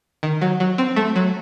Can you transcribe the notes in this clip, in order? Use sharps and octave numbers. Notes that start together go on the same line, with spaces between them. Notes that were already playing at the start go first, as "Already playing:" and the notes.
D#3
F#3
F#3
C4
A3
F#3